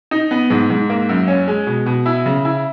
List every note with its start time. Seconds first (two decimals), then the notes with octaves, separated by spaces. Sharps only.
0.11 D#4
0.31 B3
0.50 G#2
0.70 G#2
0.90 A#3
1.09 F#2
1.28 C#4
1.48 G#3
1.67 B2
1.86 B2
2.06 E4
2.26 C#3
2.45 E4